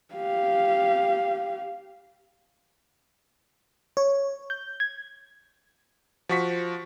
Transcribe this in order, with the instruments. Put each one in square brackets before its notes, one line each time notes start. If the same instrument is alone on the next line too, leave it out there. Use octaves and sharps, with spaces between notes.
[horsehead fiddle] G4 F5
[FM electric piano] C#5
G6
G#6
[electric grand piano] F3 F#4 C#6 B6